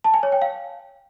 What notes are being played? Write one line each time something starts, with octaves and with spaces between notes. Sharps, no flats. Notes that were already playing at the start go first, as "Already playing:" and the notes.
A5
G#5
C#5
G5
F5